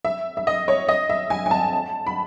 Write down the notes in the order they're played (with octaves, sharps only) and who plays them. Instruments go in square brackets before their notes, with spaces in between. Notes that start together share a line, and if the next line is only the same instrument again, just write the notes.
[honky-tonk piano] E5
E5
D#5
C#5
D#5
E5
G#5
G#5
A5
B5